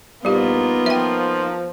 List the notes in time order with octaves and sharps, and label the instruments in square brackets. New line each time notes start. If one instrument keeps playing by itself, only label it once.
[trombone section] A#1 [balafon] G3 G4 [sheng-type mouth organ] A#3 D#4 [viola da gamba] B3 F4
[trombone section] F3 [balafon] E5 G5